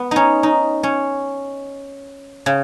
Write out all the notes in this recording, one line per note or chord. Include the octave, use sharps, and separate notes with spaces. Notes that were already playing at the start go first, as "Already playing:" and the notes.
Already playing: B3
C#4 D#4
D#4
C#4
C#3